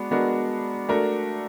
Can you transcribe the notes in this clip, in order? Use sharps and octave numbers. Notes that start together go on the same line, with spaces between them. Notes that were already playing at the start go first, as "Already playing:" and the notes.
Already playing: G#3 B3 D4 F#4
G#3 B3 D4 F#4 A#4
A3 D4 F#4 A#4